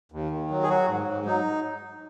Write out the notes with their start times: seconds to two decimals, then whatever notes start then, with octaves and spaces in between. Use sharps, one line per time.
0.12 D#2
0.31 D#3
0.50 F#3
0.63 G#4
0.68 F#3 F#4
0.88 G#2
1.07 G#2
1.25 F#3 D#4